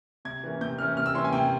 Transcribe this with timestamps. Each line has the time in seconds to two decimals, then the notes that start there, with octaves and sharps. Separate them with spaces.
0.25 C3 G#6
0.43 E3 A#3 C#4
0.61 C3 G6
0.78 E3 A#3 C#4 F6
0.97 C3 F6
1.06 E6
1.14 E3 A#3 C#4 C6
1.24 G#5
1.33 C3 G5